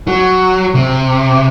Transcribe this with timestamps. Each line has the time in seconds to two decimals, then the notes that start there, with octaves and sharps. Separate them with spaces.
0.07 F#3
0.75 C3